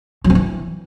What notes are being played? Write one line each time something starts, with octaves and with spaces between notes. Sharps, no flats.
F#3
C4
E3